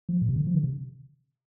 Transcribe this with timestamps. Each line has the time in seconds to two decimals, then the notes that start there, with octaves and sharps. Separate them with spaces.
0.09 F3
0.22 A#2
0.29 C3
0.36 D3
0.47 F3
0.55 D3
0.64 C3